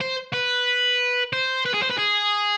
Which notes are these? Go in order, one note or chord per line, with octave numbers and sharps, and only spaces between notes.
C5
B4
C5
B4
G#4
C5
B4
G#4